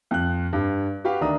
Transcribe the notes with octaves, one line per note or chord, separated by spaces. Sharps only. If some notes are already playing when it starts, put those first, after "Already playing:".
F2 F#6
G2
F#4 G4 B4 F5
D2 D#3 D4 A#5 D#6